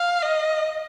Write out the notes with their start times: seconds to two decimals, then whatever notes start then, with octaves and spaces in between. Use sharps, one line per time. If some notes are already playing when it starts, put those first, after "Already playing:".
Already playing: F5
0.22 D#5